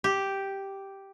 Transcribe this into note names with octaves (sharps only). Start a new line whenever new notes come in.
G4